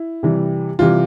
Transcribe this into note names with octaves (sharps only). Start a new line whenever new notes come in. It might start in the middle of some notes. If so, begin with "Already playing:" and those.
Already playing: E4
C3 E3 G3
C3 E3 G3 F4